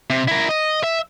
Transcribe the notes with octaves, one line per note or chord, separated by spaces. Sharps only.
C3
E4 A#4
D#5
E5